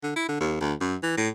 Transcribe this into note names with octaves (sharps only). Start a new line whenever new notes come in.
D3
E4
D3
D#2
D2
F#2
E3
A2